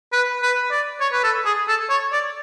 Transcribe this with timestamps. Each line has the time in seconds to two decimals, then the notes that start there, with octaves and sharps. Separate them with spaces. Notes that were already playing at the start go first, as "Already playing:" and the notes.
0.12 B4
0.42 B4
0.71 D5
1.01 C#5
1.12 B4
1.24 A4
1.45 G#4
1.68 A4
1.90 C#5
2.13 D5